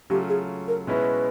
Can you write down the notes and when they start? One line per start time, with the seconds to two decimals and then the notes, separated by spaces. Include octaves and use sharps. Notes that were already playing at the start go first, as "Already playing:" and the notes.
0.10 C#3 F#3 A3 C#4 F4 G4
0.29 G#4
0.68 A#4
0.87 B2 G#3 C#4 E4 B4